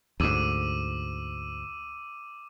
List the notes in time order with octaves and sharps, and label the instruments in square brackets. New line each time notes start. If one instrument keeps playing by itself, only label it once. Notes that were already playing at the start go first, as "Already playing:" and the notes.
[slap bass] D2 G#2 [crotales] D6 E6 D#7